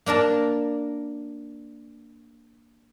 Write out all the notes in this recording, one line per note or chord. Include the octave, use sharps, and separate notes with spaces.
A#3 D4 A#4 A5